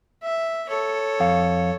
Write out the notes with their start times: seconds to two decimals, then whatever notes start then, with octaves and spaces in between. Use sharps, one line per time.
0.23 E5
0.69 A4 C#5
1.20 F2 F5